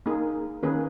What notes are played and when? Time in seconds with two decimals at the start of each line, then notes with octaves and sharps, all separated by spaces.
0.06 A#3 D#4 G#4
0.63 D#3 A#3 C#4 G#4 B4